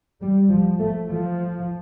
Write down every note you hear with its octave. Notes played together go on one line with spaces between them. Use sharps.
G3
F3
A3
F3